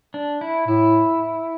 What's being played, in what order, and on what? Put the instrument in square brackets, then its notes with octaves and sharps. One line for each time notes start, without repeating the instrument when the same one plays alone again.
[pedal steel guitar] D4
E4
[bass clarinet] A2 [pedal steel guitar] E4